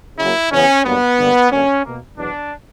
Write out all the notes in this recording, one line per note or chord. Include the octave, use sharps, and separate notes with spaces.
C#3 F#3 A#3 E4
E2 C#3 E3 B3 C#4
G2 F#3 A#3 B3
G2 D3 G3 A#3
F#2 D3 A#3 C#4
B2 A#3
E2 B2 F#3 B3 D4